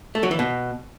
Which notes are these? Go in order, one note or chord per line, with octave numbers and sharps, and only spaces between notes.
A3
F#3
E3
B2